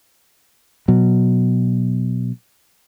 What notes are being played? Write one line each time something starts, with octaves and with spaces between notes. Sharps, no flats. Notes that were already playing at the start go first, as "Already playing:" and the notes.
B2 F#3